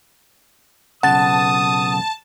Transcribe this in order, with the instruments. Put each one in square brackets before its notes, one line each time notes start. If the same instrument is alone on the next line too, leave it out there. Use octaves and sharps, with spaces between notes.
[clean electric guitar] B1 G#2 C#3 [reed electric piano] F#5 A6 [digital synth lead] A5 [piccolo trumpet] D#6